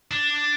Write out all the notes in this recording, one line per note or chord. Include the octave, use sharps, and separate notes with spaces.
D4